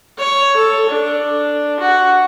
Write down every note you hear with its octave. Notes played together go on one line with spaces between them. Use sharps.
C#5
A4
D4
F#4